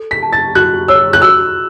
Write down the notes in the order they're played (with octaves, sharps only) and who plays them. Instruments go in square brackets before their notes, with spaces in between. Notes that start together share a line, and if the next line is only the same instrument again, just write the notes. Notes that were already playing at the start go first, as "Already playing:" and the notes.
Already playing: [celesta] A4
[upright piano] B6
[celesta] A5
[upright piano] A6
[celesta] F#4 [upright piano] F#6
[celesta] C#5 [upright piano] E6
[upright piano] F#6
[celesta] F#4 [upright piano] E6